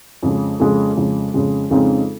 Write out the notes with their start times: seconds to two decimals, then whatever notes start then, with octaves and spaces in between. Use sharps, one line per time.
0.23 F2 C#3 G#3
0.60 F2 C#3 G#3
0.97 F2 C#3 G#3
1.34 F2 C#3 G#3
1.70 F2 C#3 G#3 C4 D#4